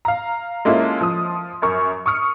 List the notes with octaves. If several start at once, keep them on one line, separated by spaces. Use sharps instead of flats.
F5 A#5
G#3 A#3 C#4 E4 F4 A4
F3 D#6
F#2 A#4 C#6
C#6 D#6 F6 C#7